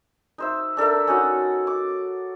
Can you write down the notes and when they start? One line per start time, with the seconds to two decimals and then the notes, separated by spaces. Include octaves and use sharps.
0.38 D#4 C5 E5
0.77 D4 A4 A#4 E5
1.07 C#4 D#4 F#4 F#5
1.67 D6